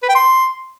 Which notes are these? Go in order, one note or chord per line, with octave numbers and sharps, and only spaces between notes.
B4
G5
C6